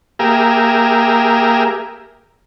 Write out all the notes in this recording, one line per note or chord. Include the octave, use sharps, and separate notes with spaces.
A#3 G4 G#4 A#4 E5